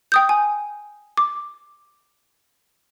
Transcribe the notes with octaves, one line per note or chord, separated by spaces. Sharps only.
G5 D#6 G6
G#5
D6